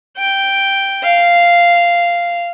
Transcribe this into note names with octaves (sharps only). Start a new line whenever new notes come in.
G5
F5